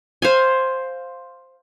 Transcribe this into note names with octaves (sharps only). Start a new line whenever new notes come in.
C5 F5 G#5